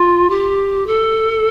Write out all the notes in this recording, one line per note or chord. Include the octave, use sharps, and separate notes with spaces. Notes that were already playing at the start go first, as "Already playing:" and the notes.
Already playing: F4
G4
A4